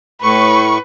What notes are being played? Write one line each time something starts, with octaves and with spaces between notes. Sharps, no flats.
A2 B4 C#6